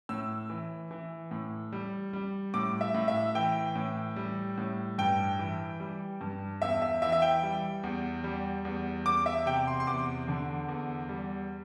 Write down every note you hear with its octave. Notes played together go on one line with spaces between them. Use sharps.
A2 E6
E3
E3
A2
G3
G3
A2 D6
E5
A2
E5
E3 G5
A2
G3
A2
G2 G5
E3
G3
G2
E2 E5
E5
E3 E5
E5
G5
G3
E2
G3
E2
E2 D6
E5
C3 G5
C6
C6
E2 D6
D3
E2
G3